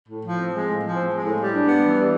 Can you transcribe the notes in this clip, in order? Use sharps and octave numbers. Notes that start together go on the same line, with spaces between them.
A2
F3
C4
G#3
A2
F3
C4
G#3
A2
G3
D4
B3
E3
G3